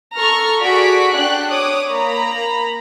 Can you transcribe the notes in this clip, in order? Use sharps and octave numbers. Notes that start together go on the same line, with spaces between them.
A4 A#5 C#6 F6
F#4 G#4 A4 D5 B6 D7
D4 G5 F#6
C#5 D6 D#6
A#3 A#5 B5